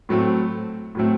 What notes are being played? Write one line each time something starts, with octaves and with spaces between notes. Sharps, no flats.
A2 F#3 A3 C4
A2 F#3 A3 C4